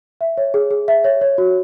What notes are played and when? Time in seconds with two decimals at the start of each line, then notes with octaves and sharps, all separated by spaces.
0.21 E5
0.37 C#5
0.54 G#4
0.71 G#4
0.88 E5
1.04 C#5
1.21 C#5
1.38 F#4